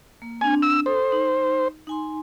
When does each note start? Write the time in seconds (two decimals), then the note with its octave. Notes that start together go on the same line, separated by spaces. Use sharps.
0.22 A#3
0.41 C4 D4 G#5
0.62 E6
0.86 A4 C5 D#6
1.12 D#4
1.87 D#4 G#5 C6